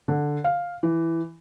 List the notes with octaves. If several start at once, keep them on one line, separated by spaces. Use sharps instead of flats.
D3
F5
E3